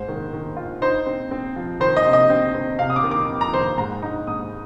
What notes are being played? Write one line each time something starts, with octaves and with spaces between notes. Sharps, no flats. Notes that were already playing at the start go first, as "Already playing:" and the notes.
Already playing: G#2 C5
D#3
D#3
F4
D#4 C5
C4
C4
F3
D#3 C5
D#5
C3
D#5
C4
C4
C3 F5
D#6
D6
D#3
D6
F2
A#5
D#3 C5
G#2 A#5
D#4
G#2 D#6